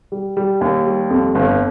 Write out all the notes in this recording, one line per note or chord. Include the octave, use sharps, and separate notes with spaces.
G3
G3
D#2
G3
F2
G1